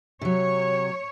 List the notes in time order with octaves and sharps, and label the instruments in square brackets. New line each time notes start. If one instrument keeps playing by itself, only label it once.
[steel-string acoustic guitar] C3 F#3 [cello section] C#5